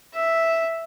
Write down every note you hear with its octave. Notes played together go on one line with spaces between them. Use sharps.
E5